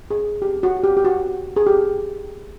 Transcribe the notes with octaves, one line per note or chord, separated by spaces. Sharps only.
G#4
G4
F#4
G4
G4
F#4
G#4
G4